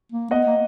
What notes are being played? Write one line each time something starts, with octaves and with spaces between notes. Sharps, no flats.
A#3
B3 D#5 F#5
A#3